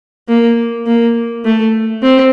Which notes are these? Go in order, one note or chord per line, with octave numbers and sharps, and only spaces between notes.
A#3
A#3
A3
C4